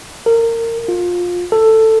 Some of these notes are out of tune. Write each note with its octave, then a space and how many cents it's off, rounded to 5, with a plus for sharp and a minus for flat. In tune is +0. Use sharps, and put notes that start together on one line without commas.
A#4 -25
F4 +20
A4 +10